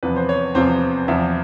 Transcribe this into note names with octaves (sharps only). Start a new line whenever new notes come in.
E2 C3 F3 B4
C5
C#5
E2 C3 F3 C5
E2 C3 F3 E5